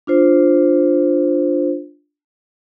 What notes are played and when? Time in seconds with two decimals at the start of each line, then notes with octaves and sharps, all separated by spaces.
0.07 D4 F4 C5